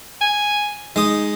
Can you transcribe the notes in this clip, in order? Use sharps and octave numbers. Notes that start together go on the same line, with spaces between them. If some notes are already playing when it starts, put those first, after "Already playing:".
G#5
G#3 D#4 D#6